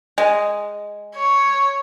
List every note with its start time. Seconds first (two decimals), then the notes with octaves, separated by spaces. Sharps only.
0.18 G#3
1.15 C#5